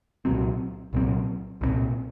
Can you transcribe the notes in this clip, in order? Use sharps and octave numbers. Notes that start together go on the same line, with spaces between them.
C2 A#2 F#3 C4
C2 A#2 F#3 C4
C2 A#2 F#3 C4